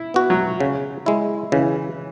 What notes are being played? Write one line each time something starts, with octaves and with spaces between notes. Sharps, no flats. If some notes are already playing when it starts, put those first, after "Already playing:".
Already playing: E4
B3 F#4
F#3
C#3
G#3 E4
C#3 E3